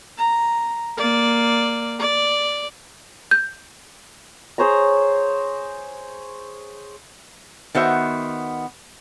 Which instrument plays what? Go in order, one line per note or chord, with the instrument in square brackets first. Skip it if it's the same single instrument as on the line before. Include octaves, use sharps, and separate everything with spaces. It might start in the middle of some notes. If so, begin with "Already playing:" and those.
[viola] A#5
A#3 D5
D5
[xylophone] G6
[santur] G#4 C5 C#5 A#5
[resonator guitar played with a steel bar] D#3 B3 F#4 C5 E5